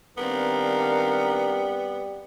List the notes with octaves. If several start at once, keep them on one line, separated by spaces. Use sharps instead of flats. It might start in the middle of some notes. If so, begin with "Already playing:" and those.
D#3 G3 B3 C4 D4 A#4 F5